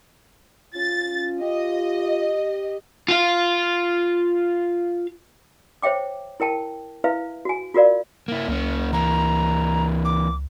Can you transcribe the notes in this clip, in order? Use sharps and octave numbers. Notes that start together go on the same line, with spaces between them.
C#4 F4 A6
G4 D#5
F4 F5
C5 C#5 E5 G5 D6
E4 A#4 G5 A5
E4 B4 E5 F5
F#4 G#5
F4 F#4 A#4 D5 F5
A#3 E4
C#2 A#3 C#4
E3 A#3 A#5
D6